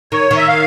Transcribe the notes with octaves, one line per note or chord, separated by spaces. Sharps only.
D#3 C#5
D#3
E5
F5